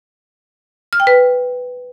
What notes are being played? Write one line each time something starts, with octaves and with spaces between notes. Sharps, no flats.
F6
G5
B4